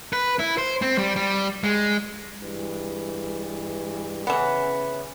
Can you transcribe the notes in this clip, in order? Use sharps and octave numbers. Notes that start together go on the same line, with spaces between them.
B4
E4
C5
C4
G3
G3
G#3
G2 E3 G#3
C#3 E3 B3 C#4